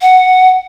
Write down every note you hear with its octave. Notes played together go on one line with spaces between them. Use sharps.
F#5